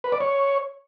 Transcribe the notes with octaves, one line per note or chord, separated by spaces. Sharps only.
B4
D5
C#5